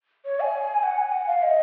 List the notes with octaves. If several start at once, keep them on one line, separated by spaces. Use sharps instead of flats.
C#5
G#5
F#5
G#5
F#5
F5
D#5